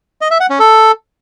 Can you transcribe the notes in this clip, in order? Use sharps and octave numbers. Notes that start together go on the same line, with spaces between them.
D#5
E5
F#5
C#4
A4